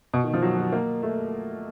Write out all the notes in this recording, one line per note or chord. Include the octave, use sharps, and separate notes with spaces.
B2
D#3
F3
F#3
F#3
A#3
A3